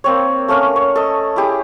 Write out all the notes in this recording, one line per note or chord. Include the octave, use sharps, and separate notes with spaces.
A#3 C4 C#5
A3 A#3 C#4 A#4
C#5
A4 D#5
E4 G4 G#4